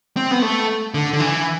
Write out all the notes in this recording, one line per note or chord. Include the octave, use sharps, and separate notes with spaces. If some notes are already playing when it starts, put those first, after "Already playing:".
C4
B3
A3
D3
D3
E3